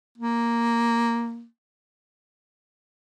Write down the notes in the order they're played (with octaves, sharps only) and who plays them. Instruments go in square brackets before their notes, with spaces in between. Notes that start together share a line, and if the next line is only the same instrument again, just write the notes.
[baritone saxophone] A#3